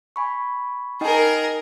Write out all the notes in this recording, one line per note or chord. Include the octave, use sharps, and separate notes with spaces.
G#5 B5 C#6
D#4 G#4 A#4 D#5 G5